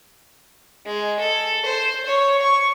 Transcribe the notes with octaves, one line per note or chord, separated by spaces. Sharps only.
G#3
A4
C5
C#5
C#6